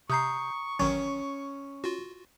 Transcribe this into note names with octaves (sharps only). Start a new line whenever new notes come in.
C3 A#5 C#6 D#6 G6 C7
A1 D#3 F#3 C#4
F4 F#4